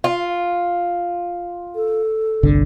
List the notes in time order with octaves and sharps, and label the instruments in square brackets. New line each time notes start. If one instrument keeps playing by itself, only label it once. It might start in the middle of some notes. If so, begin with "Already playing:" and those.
[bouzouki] F4
[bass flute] A4
[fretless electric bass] G1 C2 D3